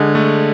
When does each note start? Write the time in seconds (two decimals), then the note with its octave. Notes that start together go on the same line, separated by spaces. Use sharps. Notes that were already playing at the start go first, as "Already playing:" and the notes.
Already playing: D3 G#3
0.15 A3